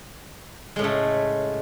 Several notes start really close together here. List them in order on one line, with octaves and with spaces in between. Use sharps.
G#3 A2 C#3 A3